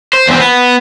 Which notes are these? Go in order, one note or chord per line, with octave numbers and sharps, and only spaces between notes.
C5
E2 C4
B3